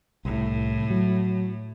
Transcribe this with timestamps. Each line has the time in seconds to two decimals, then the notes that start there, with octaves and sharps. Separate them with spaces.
0.25 C2 A2
0.90 F#3